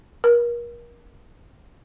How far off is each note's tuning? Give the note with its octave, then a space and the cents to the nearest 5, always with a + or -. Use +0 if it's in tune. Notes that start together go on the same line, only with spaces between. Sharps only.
A#4 +35